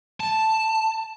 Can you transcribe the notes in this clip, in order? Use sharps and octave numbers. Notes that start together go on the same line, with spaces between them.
A5